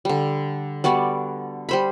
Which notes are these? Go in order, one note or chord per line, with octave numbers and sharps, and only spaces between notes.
D3 G3
G3 B3 F#4 D5
G3 C5 B5